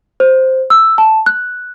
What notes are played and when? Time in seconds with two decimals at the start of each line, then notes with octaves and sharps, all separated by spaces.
0.20 C5
0.70 E6
0.98 A5
1.26 F#6